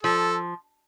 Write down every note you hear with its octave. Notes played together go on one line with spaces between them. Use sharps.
F3 A4